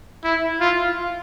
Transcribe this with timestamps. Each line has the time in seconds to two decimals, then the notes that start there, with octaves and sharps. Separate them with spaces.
0.24 E4
0.61 F4